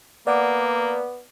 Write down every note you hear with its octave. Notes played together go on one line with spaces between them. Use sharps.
A#3 B3 D5 F#5 D6